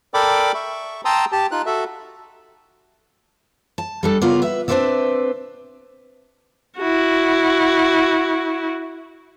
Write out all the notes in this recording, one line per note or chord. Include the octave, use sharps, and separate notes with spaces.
A4 A#4 D5 G5 B5 D6
E5 C#6
G5 A5 A#5 C6 D#6 E6
G4 A5
D#4 F4 F#6
F#4 A4 E5
A5
G3 D4 A4
C#3 B3 F4 A#4 D5
B4 E5
C4 D4 B4 C5 D5 E5
E4 F#4